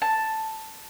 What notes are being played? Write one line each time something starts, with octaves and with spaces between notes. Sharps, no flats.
A5